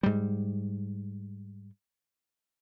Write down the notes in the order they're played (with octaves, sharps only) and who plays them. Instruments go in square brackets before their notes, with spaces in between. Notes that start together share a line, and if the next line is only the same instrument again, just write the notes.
[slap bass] G#2 G3